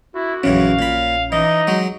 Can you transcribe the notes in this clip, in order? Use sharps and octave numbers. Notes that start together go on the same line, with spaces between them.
E4 F#4
A#1 F#2 C#3 E3 C#4 F5
A#2 B5
E3 D#4 D#5
F#3 G#3